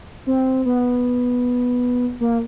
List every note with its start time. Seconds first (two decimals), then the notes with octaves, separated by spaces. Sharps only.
0.27 C4
0.66 B3
2.20 A#3